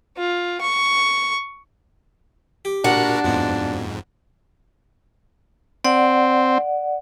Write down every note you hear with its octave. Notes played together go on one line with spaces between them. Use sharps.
F4
C#6
G4
A#2 D4 F#4 A#4 F#5
F2 G#2 B2 F3 B3
C4 D5 F#5